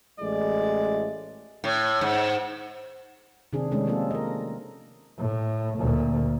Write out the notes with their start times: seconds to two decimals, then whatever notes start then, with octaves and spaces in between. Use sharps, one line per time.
0.20 A1 A2 G#3 D5
1.64 A2
2.01 G#2
3.53 C3 D#3 C4 D4 G#4
3.71 C3 D#3 G#3 A3 C#4 D4
3.86 F3 A#3 C4 D4 F4 A4
4.11 A#4 D#5
5.18 A2
5.78 D2 A#2